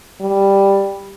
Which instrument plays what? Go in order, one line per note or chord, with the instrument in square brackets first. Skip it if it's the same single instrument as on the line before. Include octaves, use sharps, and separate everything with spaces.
[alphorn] G3